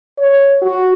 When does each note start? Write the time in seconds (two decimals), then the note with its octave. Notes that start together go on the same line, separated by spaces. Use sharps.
0.18 C#5
0.62 F#4